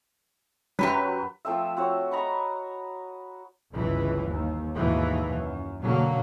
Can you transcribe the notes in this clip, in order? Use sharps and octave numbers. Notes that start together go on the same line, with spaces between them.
F#2 F#3 G4 B4 B6
F3 A3 C4 E5
C4 F#4 C#5
D#5 A#5 B5 C#6
G1 C#2 E3
D#2
D#2 G#2 B2 E3
F#2
B2 D3 F#3 A#3